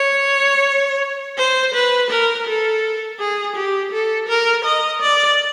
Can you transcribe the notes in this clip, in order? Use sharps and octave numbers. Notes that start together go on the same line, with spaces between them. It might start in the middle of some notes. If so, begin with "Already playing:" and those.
Already playing: C#5
C5
B4
A#4
A4
G#4
G4
A4
A#4
D#5
D5